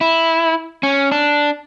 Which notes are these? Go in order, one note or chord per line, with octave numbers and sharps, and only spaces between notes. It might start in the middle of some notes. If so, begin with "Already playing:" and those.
E4
C#4
D4